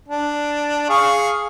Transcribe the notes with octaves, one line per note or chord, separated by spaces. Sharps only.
D4
G#4 F5 C#6